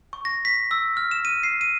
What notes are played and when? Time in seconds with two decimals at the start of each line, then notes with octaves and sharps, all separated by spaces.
0.13 C#6
0.25 A#6
0.45 B6
0.71 E6
0.97 F6
1.11 E7
1.25 D#7
1.43 C7
1.61 D#7